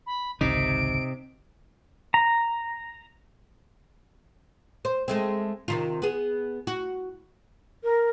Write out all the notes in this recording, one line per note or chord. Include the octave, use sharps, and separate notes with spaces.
B5
G#1 C#2 C3 D#3 D#4 D7
A#5
C5
G#3 A3 C4
C3 D#3 F4
B3 G#4
F#4
A#4